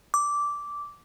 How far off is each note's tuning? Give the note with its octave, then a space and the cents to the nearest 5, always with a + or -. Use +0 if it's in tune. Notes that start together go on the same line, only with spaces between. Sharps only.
D6 -10